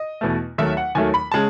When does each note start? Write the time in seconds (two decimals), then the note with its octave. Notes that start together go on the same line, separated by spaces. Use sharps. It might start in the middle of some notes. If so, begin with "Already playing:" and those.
Already playing: D#5
0.21 E2 B2 A3
0.58 D#2 D#3 F#3 A3 E5
0.77 F#5
0.95 D#2 D#3 F#3 A3 G#5
1.14 B5
1.32 C#3 G#3 A5